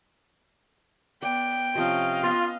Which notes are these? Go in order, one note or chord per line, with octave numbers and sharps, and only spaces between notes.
B3 D5 G5
C3 F3 C#4 D#5 F5
B3 F4